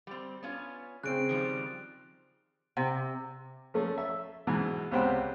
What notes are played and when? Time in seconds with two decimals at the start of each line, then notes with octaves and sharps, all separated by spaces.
0.07 G3 C4
0.43 B3 C#4 F4
1.03 C#3 C4 F#6 D7
1.29 D#3 F3 G3
2.77 C3
3.74 F3 A3 C#4
3.98 E5
4.47 G#2 B2 E3
4.91 C#2 C3 B3 C5 G5 F#6